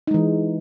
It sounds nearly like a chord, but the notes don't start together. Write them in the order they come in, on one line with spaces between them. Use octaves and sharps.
D#4 G#3 E3